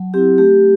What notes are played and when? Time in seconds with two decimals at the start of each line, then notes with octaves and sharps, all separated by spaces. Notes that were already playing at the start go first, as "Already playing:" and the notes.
Already playing: F#3
0.14 C4 E4 G4
0.38 A3 G4